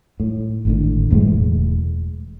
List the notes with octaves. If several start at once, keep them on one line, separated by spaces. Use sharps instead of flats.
A2
G#1 A2 D3
F#1 A2 E3 G#3
E1